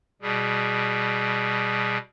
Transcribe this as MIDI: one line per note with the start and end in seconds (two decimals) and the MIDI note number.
0.22 1.98 47
0.22 1.98 55
0.22 1.98 68